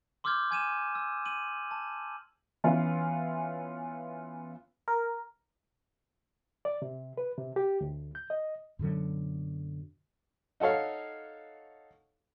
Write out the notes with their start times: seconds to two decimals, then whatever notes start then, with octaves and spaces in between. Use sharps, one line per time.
0.24 C6 D6 E6 F6 G6 G#6
0.51 G#5 G#6 D#7 E7
0.95 E6
1.25 D#7 F#7
1.71 A5
2.64 E3 B3 C#4 F4
4.88 A#4
6.65 D5
6.82 C3
7.17 B4
7.38 C3
7.56 G4
7.81 D2
8.15 G6
8.30 D#5
8.79 F#2 B2 D3 F#3
10.60 D#4 F#4 A4 C#5 F5